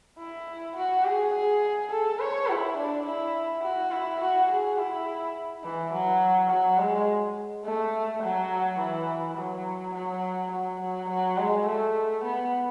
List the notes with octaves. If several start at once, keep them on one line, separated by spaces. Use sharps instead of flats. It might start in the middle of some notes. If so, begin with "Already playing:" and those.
E4
F#4
G#4
G#4
A4
C#5
E4
D4
E4
F#4
E4
F#4
G#4
E4
E3
F#3
F#3
G#3
A3
F#3
E3
F#3
F#3
F#3
F#3
F#3
G#3
A3
B3